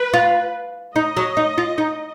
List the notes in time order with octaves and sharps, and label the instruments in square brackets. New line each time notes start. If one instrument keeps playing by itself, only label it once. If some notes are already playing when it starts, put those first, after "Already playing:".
Already playing: [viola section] B4
[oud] F4
[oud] D#4 [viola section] D#5
[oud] F#3
D#4
F4
D#4